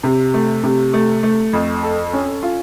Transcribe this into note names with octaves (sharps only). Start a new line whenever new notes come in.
C3
A3
C3
A3
A3
F2
A4
C#4
F4